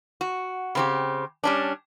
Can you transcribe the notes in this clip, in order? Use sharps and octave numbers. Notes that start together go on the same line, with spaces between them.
F#4
C#3 C4 G4
G3 C#4 D4